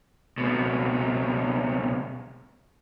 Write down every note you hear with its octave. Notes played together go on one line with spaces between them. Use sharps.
C#2 B2